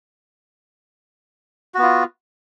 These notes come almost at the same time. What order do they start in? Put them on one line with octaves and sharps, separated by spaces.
F#4 B3 F4